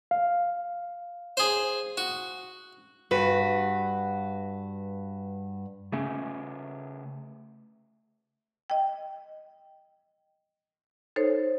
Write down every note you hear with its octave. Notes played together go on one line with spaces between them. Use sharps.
F5
G#4 C5
F#4
G2 F#4 B4
C#3 A3 C#4
D#5 G5
D#4 A4 C5 C#5